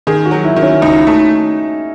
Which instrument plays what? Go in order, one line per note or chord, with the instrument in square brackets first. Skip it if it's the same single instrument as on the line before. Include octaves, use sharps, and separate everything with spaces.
[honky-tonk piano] D#3 [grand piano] G#4
[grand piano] F#4
[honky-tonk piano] F#3
[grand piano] E4
[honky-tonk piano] D#3
[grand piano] C#4
[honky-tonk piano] C#2 [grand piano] D#4
[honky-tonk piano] A3 [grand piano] D#4